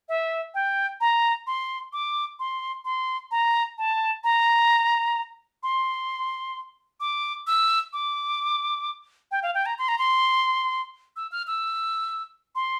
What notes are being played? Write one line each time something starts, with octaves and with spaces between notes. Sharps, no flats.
E5
G5
A#5
C6
D6
C6
C6
A#5
A5
A#5
C6
D6
E6
D6
G5
F5
G5
A#5
C6
A#5
C6
E6
F6
E6
C6